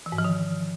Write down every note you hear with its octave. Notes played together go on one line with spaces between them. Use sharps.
E3
G#2
F3
D#3